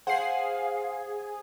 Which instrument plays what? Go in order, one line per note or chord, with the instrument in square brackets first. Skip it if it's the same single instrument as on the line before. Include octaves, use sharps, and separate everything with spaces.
[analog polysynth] G#4 [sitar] C5 [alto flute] F5 [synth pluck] F#5 C7